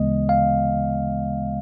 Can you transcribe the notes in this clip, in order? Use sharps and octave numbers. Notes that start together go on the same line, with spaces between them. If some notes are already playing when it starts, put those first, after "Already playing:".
Already playing: D2 C#3 E3 G#3 B3 D#5
F5